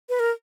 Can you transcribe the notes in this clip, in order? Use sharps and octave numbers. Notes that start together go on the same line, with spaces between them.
B4
A#4